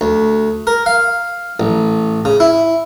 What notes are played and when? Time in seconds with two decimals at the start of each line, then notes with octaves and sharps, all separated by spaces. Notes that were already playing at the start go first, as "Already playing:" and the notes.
0.01 D2
0.67 A#4
0.86 F5
1.60 A1
2.25 C#3
2.40 E4